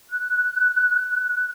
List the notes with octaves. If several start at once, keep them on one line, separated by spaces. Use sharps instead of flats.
F#6